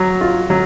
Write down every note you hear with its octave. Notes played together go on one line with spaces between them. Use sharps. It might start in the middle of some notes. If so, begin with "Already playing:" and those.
Already playing: F#3
F4
F#3